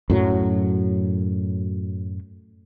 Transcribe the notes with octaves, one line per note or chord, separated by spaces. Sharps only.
F#2 A2 F#3